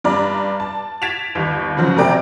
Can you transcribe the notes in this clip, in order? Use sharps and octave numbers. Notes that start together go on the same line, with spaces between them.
G2 D5 A#5
A5
G#6 A6 B6 D7 E7 F7
G1 D#2
G#2 C#3 F3 F#3
A1 C3 A#4 D5 G5